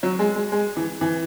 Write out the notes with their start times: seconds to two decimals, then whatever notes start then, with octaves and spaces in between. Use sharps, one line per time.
0.03 F#3
0.19 G#3
0.36 G#3
0.52 G#3
0.76 E3
1.01 E3